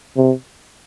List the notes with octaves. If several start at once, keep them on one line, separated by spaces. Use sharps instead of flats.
C3